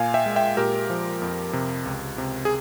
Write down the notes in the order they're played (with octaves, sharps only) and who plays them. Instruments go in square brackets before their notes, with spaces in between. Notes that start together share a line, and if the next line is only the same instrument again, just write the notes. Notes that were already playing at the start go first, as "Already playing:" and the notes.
Already playing: [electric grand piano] A#2 F5 G#5
E5 G5
G#3
E5 G5
A#2 G4 A#4
F3
F2
C3
C#2
C3
G#4